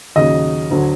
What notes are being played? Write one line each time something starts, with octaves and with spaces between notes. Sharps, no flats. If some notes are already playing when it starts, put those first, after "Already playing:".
D#2 C#3 F#3 D#5
D2 D3 F#3